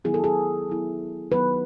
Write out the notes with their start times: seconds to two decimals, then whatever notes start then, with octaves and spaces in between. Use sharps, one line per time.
0.05 D#3 F#3 B3 E4 G#4
0.14 A4
0.24 G#4
0.68 D#3 F#3 B3 E4
1.31 D#3 F#3 B3 D#4 B4